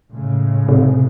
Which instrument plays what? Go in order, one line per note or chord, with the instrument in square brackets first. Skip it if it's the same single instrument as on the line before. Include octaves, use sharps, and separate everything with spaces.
[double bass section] A2 C#3 G#3
[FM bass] C3